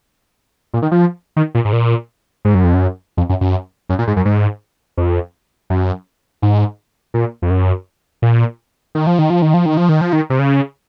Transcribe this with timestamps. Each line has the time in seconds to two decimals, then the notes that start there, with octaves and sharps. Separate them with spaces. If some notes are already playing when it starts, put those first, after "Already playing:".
0.74 A#2
0.82 D#3
0.91 F3
1.37 D#3
1.55 A#2
1.65 G#2
1.73 A#2
2.45 G#2
2.55 F#2
2.64 F2
2.74 F#2
3.17 F2
3.29 F#2
3.41 F#2
3.89 F#2
3.99 A#2
4.07 G#2
4.16 F#2
4.25 G#2
4.97 F2
5.70 F#2
6.42 G#2
7.14 A#2
7.42 F2
7.50 F#2
8.22 A#2
8.95 D#3
9.07 F3
9.19 D#3
9.30 F3
9.42 D#3
9.54 F3
9.66 D#3
9.77 F3
9.89 D#3
10.01 F3
10.13 D#3
10.30 C3
10.39 C#3